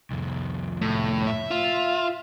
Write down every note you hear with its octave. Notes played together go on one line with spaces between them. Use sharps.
C2 F2
A2
E5
F4